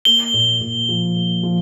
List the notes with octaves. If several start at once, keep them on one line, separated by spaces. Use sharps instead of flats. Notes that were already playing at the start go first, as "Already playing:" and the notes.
A#3 G7
A#2
A#2
F3
A#3
F3